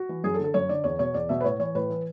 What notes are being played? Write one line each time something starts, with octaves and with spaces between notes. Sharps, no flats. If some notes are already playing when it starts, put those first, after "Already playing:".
Already playing: F#4
E3
F#2 G#4
A4
D3
A4
F#2 C#5
D3 D5
E2 C#5
B2 C#5
E2 D5
B2 E5
B4
A2 C#5
E3 C#5
A2 B4
E3